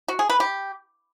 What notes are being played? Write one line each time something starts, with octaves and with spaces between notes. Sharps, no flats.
F#4
G#4
B4
G4